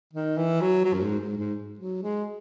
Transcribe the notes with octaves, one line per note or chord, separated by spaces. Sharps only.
D#3
E3
F#3
F#3
F#2
G#2
G#2
G#2
F#3
G#3